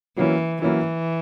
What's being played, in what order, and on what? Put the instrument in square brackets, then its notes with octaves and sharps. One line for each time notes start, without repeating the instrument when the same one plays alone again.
[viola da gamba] E3 [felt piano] F#3 A#3 C#4 E4
[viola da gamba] E3 [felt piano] F#3 A#3 C#4 E4